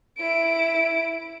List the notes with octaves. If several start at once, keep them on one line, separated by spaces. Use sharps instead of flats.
E4 D7